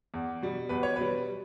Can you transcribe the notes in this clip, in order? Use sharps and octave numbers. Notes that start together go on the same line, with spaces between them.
E2
B2 G3
E2 B4
C#5
B2 G3 B4